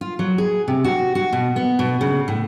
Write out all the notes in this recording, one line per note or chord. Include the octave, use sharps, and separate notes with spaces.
F4
F#3
G#4
C3
F#4
F#4
B2
B3
B2
C#3
A2